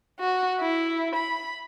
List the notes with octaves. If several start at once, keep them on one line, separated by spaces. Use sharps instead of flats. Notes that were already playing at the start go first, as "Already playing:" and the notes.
F#4
E4
B5